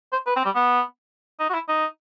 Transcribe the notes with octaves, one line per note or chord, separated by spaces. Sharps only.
C5
B4
C4
G3
B3
D#4
F#4
E4
D#4